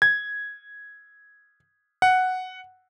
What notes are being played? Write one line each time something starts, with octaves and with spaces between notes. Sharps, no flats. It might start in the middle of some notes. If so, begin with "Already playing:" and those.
G#6
F#5